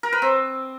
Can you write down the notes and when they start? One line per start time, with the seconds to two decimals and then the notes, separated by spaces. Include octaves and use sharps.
0.03 A#4
0.13 B4
0.22 C4